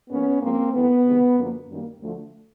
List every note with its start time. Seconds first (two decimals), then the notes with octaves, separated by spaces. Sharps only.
0.10 G#2 F3 A#3 B3 C#4
0.42 G#2 F3 G#3 A#3 C4
0.74 G2 E3 A3 B3
1.05 D2 C3 D#3 G#3
1.38 F#2 D3 F3 A#3
1.69 F#2 D#3 G3 A#3
2.00 D2 D3 F3 A3